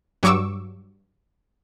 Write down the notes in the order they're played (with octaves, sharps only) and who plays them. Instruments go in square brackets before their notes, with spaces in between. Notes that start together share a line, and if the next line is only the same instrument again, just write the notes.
[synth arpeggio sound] G2 F#3 C#6 D6 E6